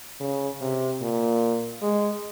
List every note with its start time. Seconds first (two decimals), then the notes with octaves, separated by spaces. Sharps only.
0.20 C#3
0.61 C3
1.01 A#2
1.82 G#3